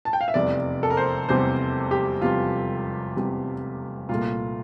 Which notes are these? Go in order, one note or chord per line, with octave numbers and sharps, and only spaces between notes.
A5
G5
F5
E5
F1 E2 C3 G3 D5
A4
A#4
C5
F1 E2 C3 G3 C5
G4
F1 E2 C3 G3 F4
F1 E2 C3 G3
C2 A#2 A3 F4